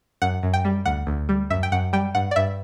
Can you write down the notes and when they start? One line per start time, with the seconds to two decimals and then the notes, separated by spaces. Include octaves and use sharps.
0.22 F#2 F#5
0.43 F#2
0.54 G5
0.65 G3
0.85 D2 F#5
1.07 D2
1.29 G3
1.50 F#2 E5
1.63 G5
1.72 F#2 F#5
1.93 G3 G5
2.15 G2 F#5
2.31 D5
2.36 G2 E5